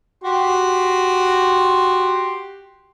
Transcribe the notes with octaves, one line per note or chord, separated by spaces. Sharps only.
F#4 G4 C6